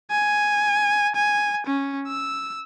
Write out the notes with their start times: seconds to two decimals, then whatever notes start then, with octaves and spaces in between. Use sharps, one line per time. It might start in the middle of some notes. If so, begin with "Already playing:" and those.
0.11 G#5
1.16 G#5
1.67 C#4
2.07 E6